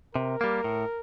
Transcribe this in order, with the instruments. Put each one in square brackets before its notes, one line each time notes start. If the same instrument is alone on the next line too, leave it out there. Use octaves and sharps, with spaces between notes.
[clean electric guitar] C3 [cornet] A#4
[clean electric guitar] G3 A#3
A2